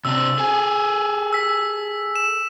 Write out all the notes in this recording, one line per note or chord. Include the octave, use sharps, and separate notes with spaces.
C3 C4 D4 E6
G#4 A4 G#5
E6 B6
E7